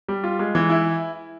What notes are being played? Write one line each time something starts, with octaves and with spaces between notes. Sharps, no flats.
G3
F4
G#3
E3
E4